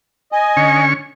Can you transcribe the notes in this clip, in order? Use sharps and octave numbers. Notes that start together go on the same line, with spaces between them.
D#5 G#5
D3 C#4 C#6